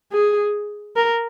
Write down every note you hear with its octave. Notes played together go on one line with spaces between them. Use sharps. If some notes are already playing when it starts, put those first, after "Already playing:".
G#4
A#4